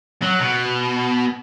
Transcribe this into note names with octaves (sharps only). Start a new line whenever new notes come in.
F#3
B2